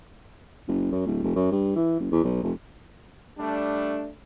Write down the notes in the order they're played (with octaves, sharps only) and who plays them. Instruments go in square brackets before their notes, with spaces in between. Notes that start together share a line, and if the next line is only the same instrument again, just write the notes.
[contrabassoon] F#1
F#2
D1
F1
F#2
G2
E3
F#1
E2
B1
F1
[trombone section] G3 A3 D4